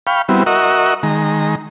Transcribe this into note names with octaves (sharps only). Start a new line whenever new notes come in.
F5 G5 B5 C#6
G3 B3 C4 E4 F#4
F#4 A#4 D#5 E5 F#5 C#6
D#3 G#3 A#5